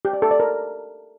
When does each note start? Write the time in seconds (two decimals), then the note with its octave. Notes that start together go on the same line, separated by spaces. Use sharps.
0.05 G4
0.13 D5
0.22 A4
0.31 D5
0.40 A#4